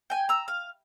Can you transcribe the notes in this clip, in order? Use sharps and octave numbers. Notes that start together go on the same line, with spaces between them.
G5 G#5
A#5 E6
F5